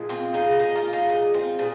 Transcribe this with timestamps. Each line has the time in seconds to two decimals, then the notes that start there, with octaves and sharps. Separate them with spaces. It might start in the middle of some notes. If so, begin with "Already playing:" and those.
Already playing: A#2 F3 G#3
0.09 C4 F4
0.34 D#4 G#4
0.59 D#4 G#4
0.76 F4 A#4
0.93 D#4 G#4
1.09 D#4 G#4
1.34 C4 F4
1.59 A#2 G#4